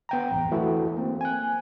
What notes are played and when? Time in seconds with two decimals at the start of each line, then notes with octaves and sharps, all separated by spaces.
0.09 B3 G5 A#5
0.31 A1 E2
0.51 E3 A3 E4 F#4 A4
0.97 A#3 C4
1.21 G#5 F#6